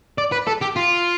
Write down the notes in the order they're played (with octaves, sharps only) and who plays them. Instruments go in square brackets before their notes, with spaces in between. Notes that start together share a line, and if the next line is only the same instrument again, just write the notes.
[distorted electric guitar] D5
B4
A4
G4
F4